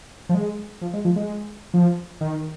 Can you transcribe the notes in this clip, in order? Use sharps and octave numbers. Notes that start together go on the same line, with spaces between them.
F3
G#3
F3
G#3
F3
G#3
F3
D#3